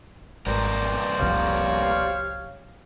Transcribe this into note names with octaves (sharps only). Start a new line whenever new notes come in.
G#1 G2 B2 A#3 A#4 C5 D5
F1 C2 F2 G4 C#5 F5